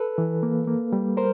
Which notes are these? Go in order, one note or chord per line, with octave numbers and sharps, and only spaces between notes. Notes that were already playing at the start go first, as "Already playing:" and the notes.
Already playing: A4 B4
E3
A#3
A#3
G3
A#4 C5